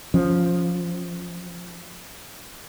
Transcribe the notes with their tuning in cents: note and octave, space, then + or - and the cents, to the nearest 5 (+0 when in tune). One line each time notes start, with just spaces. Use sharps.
F3 +5 C#4 +0